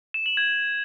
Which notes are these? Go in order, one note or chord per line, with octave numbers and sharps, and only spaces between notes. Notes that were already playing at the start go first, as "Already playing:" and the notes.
E7
F#7
G#6